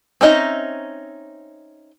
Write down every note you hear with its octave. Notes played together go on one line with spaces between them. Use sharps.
C4 C#4 D#4 D#5 E5